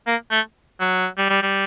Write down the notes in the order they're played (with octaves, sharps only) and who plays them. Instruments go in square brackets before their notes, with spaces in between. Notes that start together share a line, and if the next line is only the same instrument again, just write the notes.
[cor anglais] A#3
A3
F#3
G3
G3
G3